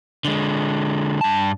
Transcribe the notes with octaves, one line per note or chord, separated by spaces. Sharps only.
D3 G#3
G2 A5